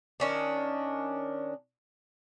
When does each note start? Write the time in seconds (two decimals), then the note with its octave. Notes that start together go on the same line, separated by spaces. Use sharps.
0.20 D#3 C#4 D4